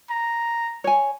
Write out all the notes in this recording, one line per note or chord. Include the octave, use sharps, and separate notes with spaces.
A#5
C#5 G#5